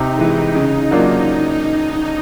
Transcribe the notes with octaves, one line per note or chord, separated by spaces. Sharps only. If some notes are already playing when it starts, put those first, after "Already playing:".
Already playing: C3 D#4
E3 G#3
C#3
F#3 A#3 D4 F4